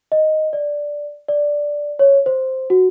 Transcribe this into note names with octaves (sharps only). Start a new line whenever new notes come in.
D#5
D5
D5
C#5
C5
F#4